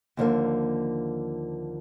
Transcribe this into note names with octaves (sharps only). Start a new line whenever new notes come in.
D#2 D3 F3 A#3